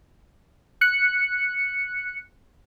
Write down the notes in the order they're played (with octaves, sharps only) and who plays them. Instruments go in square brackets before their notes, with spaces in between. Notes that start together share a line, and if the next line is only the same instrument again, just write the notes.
[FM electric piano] F#6 C#7